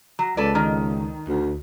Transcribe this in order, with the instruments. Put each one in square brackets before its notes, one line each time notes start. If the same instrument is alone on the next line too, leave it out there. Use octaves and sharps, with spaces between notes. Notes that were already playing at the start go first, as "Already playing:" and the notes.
[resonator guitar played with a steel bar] F#3
[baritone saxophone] C#2 [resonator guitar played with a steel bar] A4 B4 D5
[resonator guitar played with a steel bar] D#3
[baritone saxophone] D2